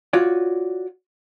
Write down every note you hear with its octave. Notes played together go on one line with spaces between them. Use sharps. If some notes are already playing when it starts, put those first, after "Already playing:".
F4 F#4 C#5 D5